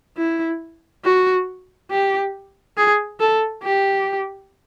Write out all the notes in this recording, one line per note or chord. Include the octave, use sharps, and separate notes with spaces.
E4
F#4
G4
G#4
A4
G4